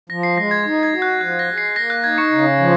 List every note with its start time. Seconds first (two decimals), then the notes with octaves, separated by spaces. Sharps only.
0.10 F3 A#6
0.23 C7
0.37 G#3 A#6
0.51 G#6
0.65 D#4
0.83 G#6
0.93 F#4
1.02 F#6
1.21 F3 F#6
1.39 A#6
1.48 G#3
1.58 C7
1.76 A#3 A#6
1.90 F#6
2.04 D#4 G#6
2.18 C#6 C#7
2.32 C#3
2.60 F3